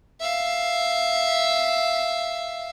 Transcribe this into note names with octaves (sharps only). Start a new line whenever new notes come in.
E5 F5